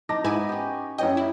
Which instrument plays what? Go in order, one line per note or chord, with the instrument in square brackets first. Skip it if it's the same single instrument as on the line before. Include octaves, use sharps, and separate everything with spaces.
[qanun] D#4 [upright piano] A5 D6 A#6
[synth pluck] G#2 E4 G#5 [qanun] B3 B4
[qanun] C#4 G4
[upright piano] F#2 C#5 G5 [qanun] G4 [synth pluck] D#5
[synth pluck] E4